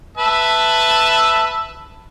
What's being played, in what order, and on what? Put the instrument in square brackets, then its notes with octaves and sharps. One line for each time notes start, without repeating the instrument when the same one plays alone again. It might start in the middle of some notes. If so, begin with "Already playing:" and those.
[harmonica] B4 E5 A5